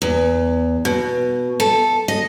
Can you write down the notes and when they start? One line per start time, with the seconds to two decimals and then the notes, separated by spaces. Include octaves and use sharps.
0.02 E2
0.85 B2
1.60 A4
2.08 D#5